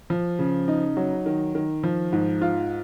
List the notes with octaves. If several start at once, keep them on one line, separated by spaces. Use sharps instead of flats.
F3
C#3
D#4
F#3
D#3
D#3
F3
G#2
F4